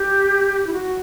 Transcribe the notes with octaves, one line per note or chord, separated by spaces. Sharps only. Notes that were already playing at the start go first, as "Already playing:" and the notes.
Already playing: G4
E4
F#4